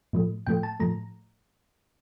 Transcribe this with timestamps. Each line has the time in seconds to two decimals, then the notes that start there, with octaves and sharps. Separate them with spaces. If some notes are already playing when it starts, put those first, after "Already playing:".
0.13 A2 F3 A3
0.47 A2 F3 A3 G5
0.63 A5
0.80 A2 F3 A3 A#5